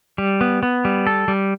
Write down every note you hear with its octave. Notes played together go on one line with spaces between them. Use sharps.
G3
B3
B3
G3
A4
G3